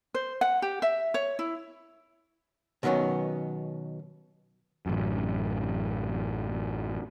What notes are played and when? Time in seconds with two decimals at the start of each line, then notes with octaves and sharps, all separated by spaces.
0.14 C5
0.41 F#5
0.62 G4
0.82 E5
1.14 C#5
1.39 E4
2.83 B2 D#3 F#3 B3 C#4
4.86 A1 F#2